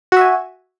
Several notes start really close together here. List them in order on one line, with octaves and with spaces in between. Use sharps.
F#4 E5 G#5